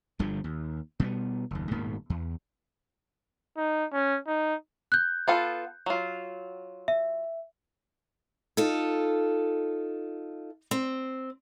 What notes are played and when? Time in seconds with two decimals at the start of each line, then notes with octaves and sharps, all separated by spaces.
0.19 G1 G2 D3 F3
0.44 D#2
1.00 B2 G3 A3 B3
1.51 F#1 D#2
1.71 D#1 G#2 B2 A#3
2.10 E2
3.57 D#4
3.93 C#4
4.27 D#4
4.92 F#6 G6
5.28 B3 F4 A4
5.86 F#3 F4
6.88 E5
8.57 D#4 F4 A4
10.71 C4